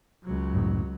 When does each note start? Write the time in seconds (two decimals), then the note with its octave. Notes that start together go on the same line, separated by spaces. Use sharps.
0.24 C#2 F#3
0.54 F#2 A2 C#3